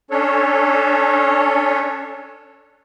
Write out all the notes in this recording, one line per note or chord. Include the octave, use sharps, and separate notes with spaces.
C#4 D4 A4 C#5